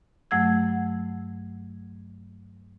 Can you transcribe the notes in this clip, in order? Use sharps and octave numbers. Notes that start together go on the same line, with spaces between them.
G2 F#3 A3 F#5 E6 G#6